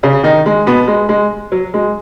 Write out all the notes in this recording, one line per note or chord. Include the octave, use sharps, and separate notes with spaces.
C#3 C#4
D#3 D#4
G#3
B2 B3
G#3
G#3
F#3
G#3